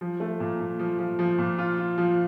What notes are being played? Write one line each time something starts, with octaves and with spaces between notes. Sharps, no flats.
F3
A3
A#2
A#2
F3
F3
F3
A#2
F4
F4
F3